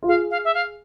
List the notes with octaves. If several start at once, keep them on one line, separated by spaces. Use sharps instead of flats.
F4
G#4 F5
F5
E5
F5